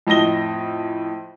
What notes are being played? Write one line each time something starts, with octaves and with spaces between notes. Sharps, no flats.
F2 A2 D#5 A#6 G7